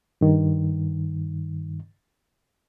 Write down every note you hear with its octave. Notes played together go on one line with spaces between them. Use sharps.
G2 D#3